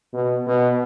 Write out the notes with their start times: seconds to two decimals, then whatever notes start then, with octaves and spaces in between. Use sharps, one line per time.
0.14 B2
0.47 B2